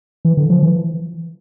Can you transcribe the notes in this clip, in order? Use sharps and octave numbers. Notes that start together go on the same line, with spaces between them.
E3
D3
F3
E3